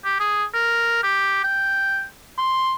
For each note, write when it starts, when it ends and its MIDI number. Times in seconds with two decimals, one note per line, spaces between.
0.05 0.16 67
0.20 0.44 68
0.54 1.01 70
1.03 1.41 67
1.44 2.05 79
2.38 2.75 84